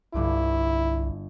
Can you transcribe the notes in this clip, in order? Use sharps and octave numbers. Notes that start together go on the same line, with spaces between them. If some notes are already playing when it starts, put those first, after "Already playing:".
G1 C2 G2 E4 D6